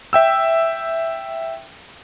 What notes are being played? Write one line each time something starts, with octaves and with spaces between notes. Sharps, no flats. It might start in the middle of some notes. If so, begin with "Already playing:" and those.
E5 G5 E6